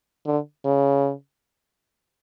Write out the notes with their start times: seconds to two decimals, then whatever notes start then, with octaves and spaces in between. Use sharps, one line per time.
0.26 D3
0.65 C#3